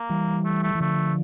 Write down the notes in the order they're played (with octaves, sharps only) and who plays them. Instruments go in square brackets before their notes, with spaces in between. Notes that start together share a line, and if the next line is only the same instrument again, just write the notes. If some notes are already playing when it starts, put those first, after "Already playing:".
Already playing: [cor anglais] A#3
[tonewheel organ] E3 G3
[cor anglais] A3
A3
[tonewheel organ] E3
[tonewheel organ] D3 F3 [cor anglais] A3